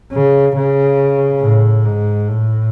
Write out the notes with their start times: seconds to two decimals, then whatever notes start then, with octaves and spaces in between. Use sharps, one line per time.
0.12 C#3
0.56 C#3
1.42 A2
1.86 G#2
2.29 A2